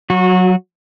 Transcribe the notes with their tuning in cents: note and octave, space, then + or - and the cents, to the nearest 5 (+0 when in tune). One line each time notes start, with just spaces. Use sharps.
F#3 +0 F#4 -25